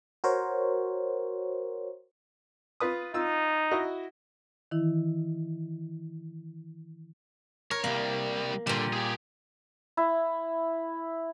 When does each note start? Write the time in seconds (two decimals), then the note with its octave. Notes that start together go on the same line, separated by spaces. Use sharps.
0.24 F#4 A#4 C5 C#5
2.80 F4 B4 D#6
3.14 D#4 F4 E6
3.71 E4 F#4 D#5
4.71 D#3 E3 E4
7.71 A#4 C#5
7.84 C2 G3 A#3
8.67 A#2 D3 G3
8.93 G4 G#4
9.97 E4